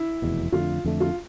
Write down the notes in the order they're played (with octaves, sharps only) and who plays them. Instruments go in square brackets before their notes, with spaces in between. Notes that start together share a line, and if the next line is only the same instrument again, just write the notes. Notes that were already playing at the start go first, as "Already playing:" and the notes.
Already playing: [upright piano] E4
[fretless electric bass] F1 E2 B2
[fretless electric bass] F2 D3 A3 [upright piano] F4
[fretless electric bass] F2 D3 A3
[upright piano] F4